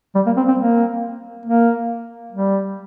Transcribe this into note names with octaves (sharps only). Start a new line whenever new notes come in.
G3
A#3
C4
C4
A#3
A#3
G3